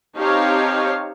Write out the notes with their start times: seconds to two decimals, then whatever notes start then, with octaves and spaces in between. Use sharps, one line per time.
0.17 C4 D#4 G4 C#5 F5 A5